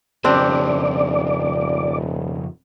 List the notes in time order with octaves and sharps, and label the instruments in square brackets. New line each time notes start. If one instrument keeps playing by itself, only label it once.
[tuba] D#1 [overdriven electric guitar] F2 C#3 [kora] C4 D4 G4 [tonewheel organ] D5